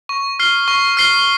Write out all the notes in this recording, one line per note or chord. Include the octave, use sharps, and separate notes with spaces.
C#6
F6 C7 G7
C#6
F6 C7 G7